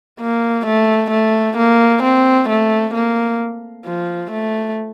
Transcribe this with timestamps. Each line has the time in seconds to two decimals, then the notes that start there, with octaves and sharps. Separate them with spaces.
0.20 A#3
0.66 A3
1.11 A3
1.57 A#3
2.03 C4
2.49 A3
2.94 A#3
3.86 F3
4.31 A3